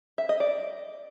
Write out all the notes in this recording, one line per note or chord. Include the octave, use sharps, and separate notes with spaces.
E5
D#5
D5